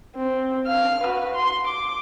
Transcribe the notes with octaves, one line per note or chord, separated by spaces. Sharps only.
C4
F5 F6
F#4 B4
C6
D6